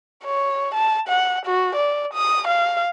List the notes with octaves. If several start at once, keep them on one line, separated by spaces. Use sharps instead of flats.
C#5
A5
F#5
F#4
D5
D#6
F5